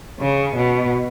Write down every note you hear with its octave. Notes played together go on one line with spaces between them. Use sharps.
C#3
B2